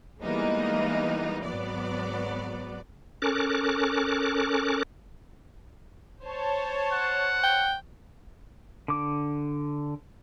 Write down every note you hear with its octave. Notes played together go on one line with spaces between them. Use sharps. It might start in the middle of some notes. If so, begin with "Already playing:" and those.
E3 G3 G#3 A#3 B3 D#4
G#1 F#3 B3 D5
C#4 A4 A#4 D6 F#6
C5 C#5 A5
F#5
G5
D3 D6